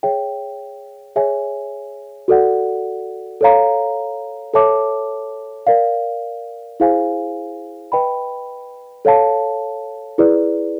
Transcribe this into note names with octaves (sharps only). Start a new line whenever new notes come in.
G#4 C#5 E5 G5
G#4 C#5 E5 G#5
F#4 A4 D5 F#5
A4 C#5 F5 A#5
A4 C#5 E5 A5 D6
A#4 D5 F5
E4 G#4 C5 F5 G#5
B4 D#5 G5 B5
A4 C#5 F5 A5
E4 G#4 B4 D5